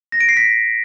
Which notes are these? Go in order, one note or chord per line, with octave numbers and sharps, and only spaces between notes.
A#6
D7
C7
B6